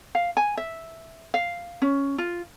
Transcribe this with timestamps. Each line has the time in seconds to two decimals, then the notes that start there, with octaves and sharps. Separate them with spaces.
0.15 F5
0.37 G#5
0.57 E5
1.34 F5
1.82 C#4
2.18 F4